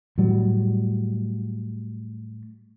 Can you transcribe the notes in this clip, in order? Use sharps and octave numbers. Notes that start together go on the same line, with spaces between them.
A2 F#3 G3